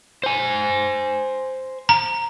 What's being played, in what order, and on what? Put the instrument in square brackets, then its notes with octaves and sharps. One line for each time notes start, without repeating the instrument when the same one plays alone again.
[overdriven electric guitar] C5 G#5
[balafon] A#5